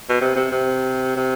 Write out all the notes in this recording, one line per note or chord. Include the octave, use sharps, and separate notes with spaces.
B2
C3
C3
C3
C3